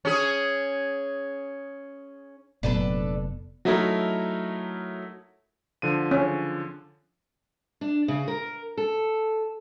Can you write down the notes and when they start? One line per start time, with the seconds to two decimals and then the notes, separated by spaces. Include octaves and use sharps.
0.05 C#4 G#4
2.63 F1 A#2 F#3 B3 D4 A4 B4
3.65 F#3 A3 D#4 E4 A#4
5.82 D3 F3 D#7
6.11 C#4
7.81 D4
8.08 C#3
8.28 A#4
8.78 A4